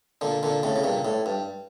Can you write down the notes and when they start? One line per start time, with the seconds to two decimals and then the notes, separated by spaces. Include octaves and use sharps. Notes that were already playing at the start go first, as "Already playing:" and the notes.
0.21 A#2 D3
0.43 A#2 D3
0.63 A2 C#3
0.76 C#3
0.84 G2 A#2
1.05 A2
1.26 G2